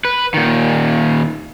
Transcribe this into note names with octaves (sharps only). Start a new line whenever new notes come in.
B4
A#2 D#3